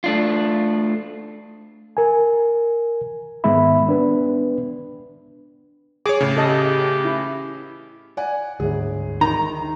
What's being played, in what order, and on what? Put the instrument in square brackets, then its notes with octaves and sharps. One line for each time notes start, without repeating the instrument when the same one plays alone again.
[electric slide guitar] A3 D4 F4
[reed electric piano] A#4 G#5
G#2 D#3 G#3 B3 E5 B5
B3 D4 B4
[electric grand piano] G#4 C#5 [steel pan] D6
[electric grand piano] A2 C#3
[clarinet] G4 [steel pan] A4 D#5 A5
[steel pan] E4
[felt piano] D5 F#5 G#5
[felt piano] G1 G#4 [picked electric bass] D2 G#2
[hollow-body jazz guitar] D#3 [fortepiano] A#5